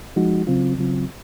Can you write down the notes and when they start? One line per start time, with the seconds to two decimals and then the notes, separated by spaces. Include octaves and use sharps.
0.16 F3 G#3 D#4 F#4
0.47 C#3 F#3 C4 F4
0.79 C#3 F#3 C4 F4